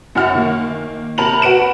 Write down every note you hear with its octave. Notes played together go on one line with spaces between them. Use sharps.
F#2 E4 F#5 F6
D#3 A#3
C3 A#4 A5 B5 F7 F#7
F#4 B4 D7 E7